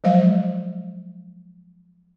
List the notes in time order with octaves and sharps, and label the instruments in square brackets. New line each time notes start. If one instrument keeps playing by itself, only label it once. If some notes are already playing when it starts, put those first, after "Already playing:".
[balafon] F3 F#3 G#3 C5 D#5 F5